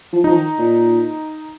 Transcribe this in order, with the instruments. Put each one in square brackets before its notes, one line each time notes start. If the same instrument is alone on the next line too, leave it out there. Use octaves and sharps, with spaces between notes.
[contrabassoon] F3
[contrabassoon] F3 [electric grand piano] D#4
[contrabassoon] D#3
A#2